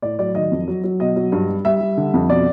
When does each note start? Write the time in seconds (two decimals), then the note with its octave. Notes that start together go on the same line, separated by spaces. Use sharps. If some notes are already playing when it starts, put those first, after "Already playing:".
0.02 A2 D5
0.19 F#3 D5
0.35 D#3 D#5
0.51 F2
0.68 F#3
0.84 F#3
1.00 B2 D#5
1.16 F#3
1.32 G2
1.49 G3
1.65 G3 E5
1.81 G3
1.97 D3
2.14 F2
2.30 B2 D5